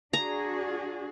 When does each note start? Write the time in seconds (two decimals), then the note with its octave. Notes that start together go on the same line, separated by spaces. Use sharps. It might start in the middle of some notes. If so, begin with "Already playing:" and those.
0.13 D4 F#4 G#4 A#5